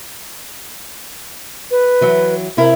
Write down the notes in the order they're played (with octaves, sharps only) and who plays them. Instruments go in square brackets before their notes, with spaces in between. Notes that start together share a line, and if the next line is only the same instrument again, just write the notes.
[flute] B4
[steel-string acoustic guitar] E3 F#3
C3 E4 A#4